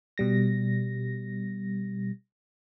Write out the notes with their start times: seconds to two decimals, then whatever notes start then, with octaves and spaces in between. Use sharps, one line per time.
0.18 B2 G3 A#6